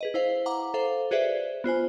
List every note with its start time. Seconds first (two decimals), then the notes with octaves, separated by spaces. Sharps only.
0.01 G#4 B4 D#5
0.14 E4 C5 F5
0.46 F#5 A#5 D6
0.74 A4 C5 F5
1.11 F#4 G#4 B4 C5 D5 E5
1.64 B3 F4 C5 G#5